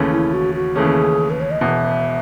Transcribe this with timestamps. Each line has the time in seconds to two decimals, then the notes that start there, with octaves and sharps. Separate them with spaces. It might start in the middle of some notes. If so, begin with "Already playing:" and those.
Already playing: D#2 C#3 E3 A3 C#4
0.12 E4
0.33 F#4
0.55 F#4
0.76 D#2 C#3 E3 A3 C#4 G#4
1.31 B4
1.41 C#5
1.51 D#5
1.61 E1 E2 B2 E5